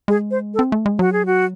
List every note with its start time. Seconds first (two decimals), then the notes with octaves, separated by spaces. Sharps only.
0.08 G#3 G#4
0.31 C5
0.54 A4
0.59 C4
0.72 A3
0.86 G#3
0.99 F#3 F#4
1.13 G#4
1.26 F#4